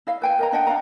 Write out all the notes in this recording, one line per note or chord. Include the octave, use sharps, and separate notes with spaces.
E4 D#5 F5
B4 G5 G#5
A#4 D#5 A#5
D4 D#5 F#5 G5
D4 D#4 F5 A#5